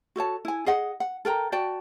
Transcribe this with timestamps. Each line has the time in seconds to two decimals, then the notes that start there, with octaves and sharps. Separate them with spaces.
0.16 F#4 A4 C#5 A5
0.45 E4 G#5
0.66 G#4 D#5 F#5
1.00 F#5
1.25 A4 A#4 G5 A#5
1.52 F#4 D5 G5 A5